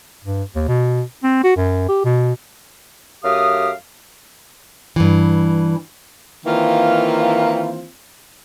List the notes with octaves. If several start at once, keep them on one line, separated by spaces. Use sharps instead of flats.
G2
D#2
B2
C4
F#4
F#2
G4
B2
F#2 A3 G4 F5 D#6
G2 E3
D#3 E3 A#3 C4 F4